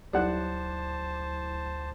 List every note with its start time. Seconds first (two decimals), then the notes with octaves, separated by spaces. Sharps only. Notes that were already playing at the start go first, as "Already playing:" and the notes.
0.13 D2 F#3 G3 E4 C5 F#5 A5 F#6